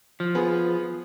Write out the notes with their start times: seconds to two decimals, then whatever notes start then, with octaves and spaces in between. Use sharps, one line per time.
0.20 F3
0.35 B3 G#4 B4